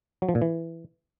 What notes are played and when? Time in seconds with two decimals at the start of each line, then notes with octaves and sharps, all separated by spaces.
0.22 F#3
0.29 F3
0.35 A#2
0.42 E3